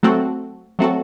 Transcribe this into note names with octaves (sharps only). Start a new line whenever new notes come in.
F#3 A3 C4 F#4 A4
F#3 A3 C4 F#4 A4